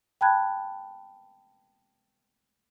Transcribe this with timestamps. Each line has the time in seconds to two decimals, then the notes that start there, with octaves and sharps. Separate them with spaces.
0.21 G5 A5 B5 F#6 G#6